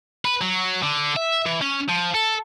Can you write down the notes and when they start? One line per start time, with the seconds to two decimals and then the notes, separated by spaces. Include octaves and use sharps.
0.25 B4
0.41 F#3
0.83 D3
1.16 E5
1.46 E3
1.62 C#4
1.89 F3
2.15 A4